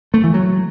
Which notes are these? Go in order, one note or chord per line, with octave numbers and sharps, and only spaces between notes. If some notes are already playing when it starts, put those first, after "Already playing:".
A3
E3
F#3